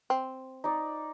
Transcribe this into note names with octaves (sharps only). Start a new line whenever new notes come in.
C4
D#4 D5